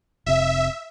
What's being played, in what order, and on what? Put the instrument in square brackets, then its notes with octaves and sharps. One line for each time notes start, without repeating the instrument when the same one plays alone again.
[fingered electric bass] F1 C3 [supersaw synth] E5